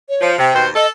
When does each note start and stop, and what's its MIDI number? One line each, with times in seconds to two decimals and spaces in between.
0.09 0.31 73
0.21 0.37 53
0.39 0.55 48
0.39 0.64 79
0.55 0.70 39
0.55 0.70 47
0.55 0.70 72
0.75 0.90 69
0.75 0.86 75